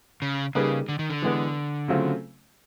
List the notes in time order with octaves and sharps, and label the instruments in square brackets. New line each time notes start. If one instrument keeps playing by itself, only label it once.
[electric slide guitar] C#3
[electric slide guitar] C#3 [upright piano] G3 A#3 D#4 G#4 B4
[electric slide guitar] D3
D#3
D3
[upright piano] E3 G#3 B3
C#3 F#3 A3 C4 F4